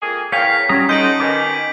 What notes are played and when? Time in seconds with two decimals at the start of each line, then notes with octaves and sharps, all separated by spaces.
0.02 F2 A#3 G#4
0.32 E2 A#4 C#5 F5 G5 G#5 B6
0.69 A#2 D#3 F#3 G3 C#4 A#5 D#6
0.89 D#4 F#4 A4 C6 G6 D7 F#7
1.20 B2 D#3 G#5 D6